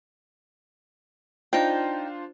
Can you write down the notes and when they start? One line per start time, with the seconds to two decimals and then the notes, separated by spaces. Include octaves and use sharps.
1.53 D4 D#4 F4 C5 G5